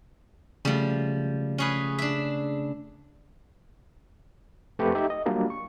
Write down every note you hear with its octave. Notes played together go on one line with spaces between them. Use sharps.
C#3 F3 G3 A3
C#4 G#4 B4
D4 E5
F2 A3 C4 G4 B4 C#6
D#4 G4 D#5 E5
D#5
F#3 G3 A#3 D4 F4
C#6